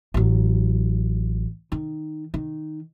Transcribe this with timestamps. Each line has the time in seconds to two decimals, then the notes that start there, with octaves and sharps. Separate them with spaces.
0.14 A1 F#3
1.72 D#3
2.34 D#3